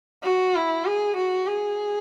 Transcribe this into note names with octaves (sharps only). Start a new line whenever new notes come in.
F#4
E4
G#4
F#4
G#4